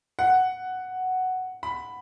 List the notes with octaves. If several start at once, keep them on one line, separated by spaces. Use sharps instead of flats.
F#5
B5